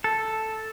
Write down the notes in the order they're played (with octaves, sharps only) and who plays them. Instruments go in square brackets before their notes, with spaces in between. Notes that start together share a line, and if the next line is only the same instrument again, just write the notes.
[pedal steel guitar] A4